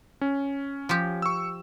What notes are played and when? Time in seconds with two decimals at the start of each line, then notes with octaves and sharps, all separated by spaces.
0.21 C#4
0.89 F3 G4
1.22 C#6 E6